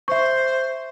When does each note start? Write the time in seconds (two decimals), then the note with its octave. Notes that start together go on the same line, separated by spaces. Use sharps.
0.08 C5 E5 C#6